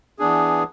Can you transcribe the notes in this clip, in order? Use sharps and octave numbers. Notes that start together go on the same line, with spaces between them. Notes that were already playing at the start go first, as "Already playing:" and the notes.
E3 B3 D4 G#4